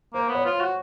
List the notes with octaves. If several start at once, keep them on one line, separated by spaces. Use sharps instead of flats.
A#3 C5
B3
C#5
F4 C5
F#4